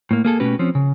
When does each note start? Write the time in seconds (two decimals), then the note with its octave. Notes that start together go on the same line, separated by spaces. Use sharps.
0.11 A2 A#3
0.25 A#3 G#4 A4
0.40 B2 A3 C#4 F#4 G4 B4
0.59 F3 C4 C#4
0.75 C#3